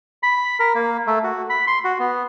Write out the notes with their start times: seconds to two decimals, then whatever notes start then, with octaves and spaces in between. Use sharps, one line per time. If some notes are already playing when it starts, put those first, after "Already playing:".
0.23 B5
0.59 A#4
0.75 A#3
1.07 A3
1.24 F#4
1.50 B5
1.67 C6
1.84 F#4
1.99 B3